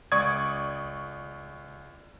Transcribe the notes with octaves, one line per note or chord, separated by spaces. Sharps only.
C#2 D5 C#6 D#6 G#6